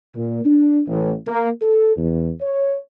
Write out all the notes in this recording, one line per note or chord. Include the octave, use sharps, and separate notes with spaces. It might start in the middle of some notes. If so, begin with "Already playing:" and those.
A#2
D4
A1
A#3
A4
E2
C#5